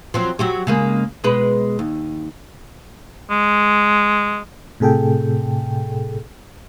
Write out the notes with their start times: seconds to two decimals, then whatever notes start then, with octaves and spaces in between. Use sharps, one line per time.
0.14 F3 F#3 C4
0.39 F#3 F#4 G4
0.67 C#3 G#3 A#3
1.24 B2 G#3 B4
1.79 D#2
3.30 G#3
4.80 A2 C3 G#4 A4 G5